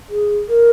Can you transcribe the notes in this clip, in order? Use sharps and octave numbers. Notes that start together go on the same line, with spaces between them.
G#4
A#4